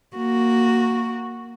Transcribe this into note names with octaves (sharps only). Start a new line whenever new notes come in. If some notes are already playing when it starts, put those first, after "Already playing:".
A#3 F#4